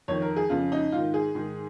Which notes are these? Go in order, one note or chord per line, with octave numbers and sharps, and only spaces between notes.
F2 D#3 C#5
A#4
G#4
F2 C#3 F4
D#4
G#2 D#3 F4
G#4
G#2 D#3